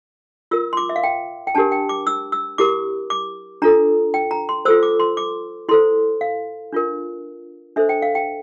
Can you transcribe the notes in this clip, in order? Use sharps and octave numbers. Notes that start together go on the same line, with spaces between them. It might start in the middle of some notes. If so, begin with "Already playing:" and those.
F4 A#4 E6
C6
D6
E5
F5
G5
G5
D4 G4 A#4 A5
G5
D6
E6
E6
E4 G4 A#4 D6
D6
D4 F4 A4 A#5
G5
A#5
C6
F4 A4 C5 E6
D6
C6
D6
E4 A4 C5 C6
F5
D4 F4 A#4
D4 A4 C5 E5
G5
F5
G5